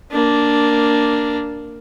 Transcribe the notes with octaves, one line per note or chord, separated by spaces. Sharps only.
A#3 D4